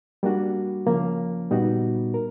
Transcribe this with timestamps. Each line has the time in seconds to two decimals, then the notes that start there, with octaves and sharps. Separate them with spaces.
0.23 G3 A#3 D4 F#4
0.86 C#3 F3 A#3 C#4
1.51 A#2 G3 B3 D#4 F#4
2.14 A#4